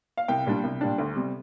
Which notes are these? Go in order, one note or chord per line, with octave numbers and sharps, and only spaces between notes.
F5
C2 G5
A#2 G3 D4
C2
A#2 G3 D4
D2
C3 G3